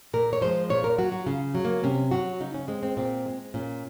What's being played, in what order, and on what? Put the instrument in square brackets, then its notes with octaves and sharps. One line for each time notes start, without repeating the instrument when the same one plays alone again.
[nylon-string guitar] A#2 A#4
C#5
F3 G#3 C5
A#2 C#5
A#4
F#3 F#4
F#4
C#3 F4
F#3
A#3
C3 C#4
F#3 F#4
C#3 D#4
C#4
G#3 C4
C4
A#2 C4
G#3
A#2 C#4